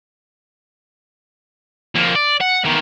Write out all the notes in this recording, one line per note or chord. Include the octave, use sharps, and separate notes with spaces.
F2 A#3
D5
F#5
E2 D#3